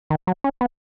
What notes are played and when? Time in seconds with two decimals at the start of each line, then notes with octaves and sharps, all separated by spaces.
0.10 D#3
0.27 F#3
0.44 C#4
0.61 B3